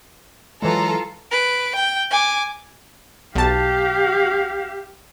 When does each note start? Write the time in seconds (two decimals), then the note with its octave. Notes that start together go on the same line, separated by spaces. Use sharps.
0.62 E3 F#3 G#3 F4 A4 A#5
1.31 B4 D7
1.76 G5
2.11 G#5 D6
3.35 B1 G4 F5 A5